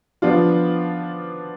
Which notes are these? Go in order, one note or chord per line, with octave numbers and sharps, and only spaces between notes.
F3 B3 D4 F4